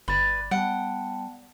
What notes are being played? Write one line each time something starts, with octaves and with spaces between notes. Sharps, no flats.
G1 B4 D5 B5
G3 B3 F#5 G5 A5